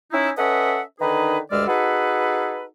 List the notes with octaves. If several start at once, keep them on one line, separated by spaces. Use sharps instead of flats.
C#4 D#4 E4
C#4 A4 B4 D#5 E5 F#5
D3 D#3 D#4 G#4 B4
D2 G2 G#3 D5 E6 F6
D#4 F#4 G#4 A4 B4